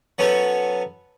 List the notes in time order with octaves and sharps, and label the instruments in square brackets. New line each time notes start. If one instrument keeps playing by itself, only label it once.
[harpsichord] F#3 B3 C#4 A4